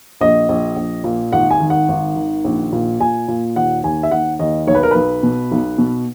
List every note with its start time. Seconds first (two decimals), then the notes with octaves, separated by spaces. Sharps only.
0.21 A#1 D#5
0.49 A#1
0.76 A#1
1.04 A#2
1.32 G#1 F#5
1.50 G#5
1.60 D#3
1.70 F#5
1.88 G#1
2.16 D#3
2.44 A#1
2.72 A#2
3.00 A#2 G#5
3.28 A#2
3.56 D#2 F#5
3.84 D#2 G#5
4.03 E5
4.11 D#2 F#5
4.39 D#2 D#5
4.67 B1 C#5
4.75 B4
4.83 A#4
4.91 B1 B4
5.23 B2
5.51 B1
5.78 B2